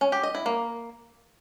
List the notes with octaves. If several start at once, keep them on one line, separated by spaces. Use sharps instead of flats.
C#4
G4
D#5
E4
A#3